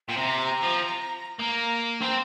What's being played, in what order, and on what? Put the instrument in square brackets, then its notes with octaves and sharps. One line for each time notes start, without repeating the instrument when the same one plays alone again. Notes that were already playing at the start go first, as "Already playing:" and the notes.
[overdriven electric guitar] A#2 [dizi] G5
[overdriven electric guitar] C3 [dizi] A#5
[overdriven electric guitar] F3
[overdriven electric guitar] A#3 [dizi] A#5
[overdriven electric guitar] C4 [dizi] G5